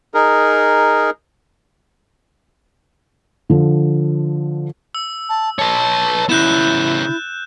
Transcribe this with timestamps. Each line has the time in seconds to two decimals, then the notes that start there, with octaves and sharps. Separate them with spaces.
0.14 D#4 G#4 A#4
3.50 D3 F3
4.95 E6
5.29 A5
5.59 B4 C#5 A5 A6
6.29 C#3 B3 E4 F#6 G6 E7